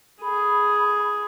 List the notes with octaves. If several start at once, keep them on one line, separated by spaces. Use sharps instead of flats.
G#4 B5